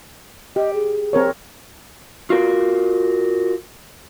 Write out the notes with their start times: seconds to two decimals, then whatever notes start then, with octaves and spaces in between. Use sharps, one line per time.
0.56 G4 D#5
0.74 G#4
1.13 C4 A#4 C#5
2.30 F4 F#4 A#4